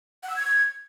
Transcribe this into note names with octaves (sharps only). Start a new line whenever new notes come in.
F#5
E6
G#6